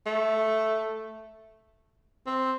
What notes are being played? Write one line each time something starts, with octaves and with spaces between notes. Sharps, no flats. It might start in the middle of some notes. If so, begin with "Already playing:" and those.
A3
C4